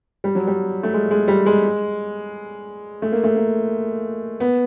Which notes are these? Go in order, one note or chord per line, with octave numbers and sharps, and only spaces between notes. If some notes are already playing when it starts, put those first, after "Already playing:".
G3
F#3
G3
A3
G#3
G#3
G3
G#3
A3
A#3
A3
A#3
B3